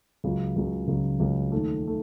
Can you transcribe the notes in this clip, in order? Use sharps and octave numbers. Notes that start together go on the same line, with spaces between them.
C#2 C#3 F#3
C#2 C#3 F#3
C#2 C#3 F#3
C#2 C#3 F#3
D#2 D#3 A3
D#3 A3